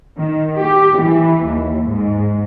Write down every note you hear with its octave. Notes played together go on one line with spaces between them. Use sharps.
D#3
G4
E3
D#2
G#2